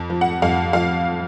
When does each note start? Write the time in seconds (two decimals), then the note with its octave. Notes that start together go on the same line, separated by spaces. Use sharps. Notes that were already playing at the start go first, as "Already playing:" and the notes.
Already playing: F2
0.10 F3
0.21 F#5
0.42 F2 F5
0.73 F3 F5